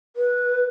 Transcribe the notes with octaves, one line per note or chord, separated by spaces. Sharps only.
B4